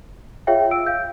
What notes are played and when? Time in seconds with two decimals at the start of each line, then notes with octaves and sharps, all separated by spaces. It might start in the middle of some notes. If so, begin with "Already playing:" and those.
0.47 F4 G#4 C#5 E5 F5 G5
0.71 E6 D7
0.86 F5 G6